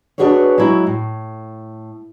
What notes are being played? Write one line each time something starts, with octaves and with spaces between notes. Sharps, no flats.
D4 D#4 F#4 G#4 B4 C#5
F#3 G#3 E4 F#4
A2